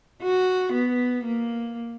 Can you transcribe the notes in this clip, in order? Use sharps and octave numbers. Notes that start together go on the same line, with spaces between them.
F#4
B3
A#3